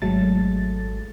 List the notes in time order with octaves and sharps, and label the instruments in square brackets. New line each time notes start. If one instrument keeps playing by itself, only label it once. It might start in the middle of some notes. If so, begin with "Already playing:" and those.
[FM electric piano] G#1 F#3 G#3 A3 A4 A6